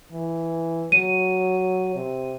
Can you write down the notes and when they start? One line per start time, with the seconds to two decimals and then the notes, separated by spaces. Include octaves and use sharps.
0.12 E3
0.92 F#3 D#7
1.95 C3